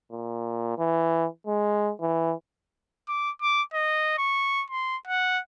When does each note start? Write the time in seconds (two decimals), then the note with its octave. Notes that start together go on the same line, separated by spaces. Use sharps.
0.11 A#2
0.78 E3
1.47 G#3
2.01 E3
3.09 D6
3.42 D6
3.74 D#5
4.18 C#6
4.70 C6
5.08 F#5